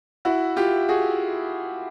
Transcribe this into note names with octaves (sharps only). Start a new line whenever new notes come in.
E4 F#4
F4 G4
F#4 G#4